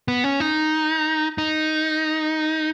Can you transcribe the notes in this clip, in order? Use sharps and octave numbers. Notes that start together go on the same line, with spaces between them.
B3
C#4
D#4
D#4